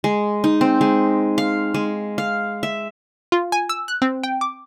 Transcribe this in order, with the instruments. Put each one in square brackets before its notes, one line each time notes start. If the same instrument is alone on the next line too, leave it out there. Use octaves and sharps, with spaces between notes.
[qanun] G#3
D#4
C4
G#3
F5
G#3
F5
E5
[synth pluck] F4
G#5
E6
F#6
C4
G5
D6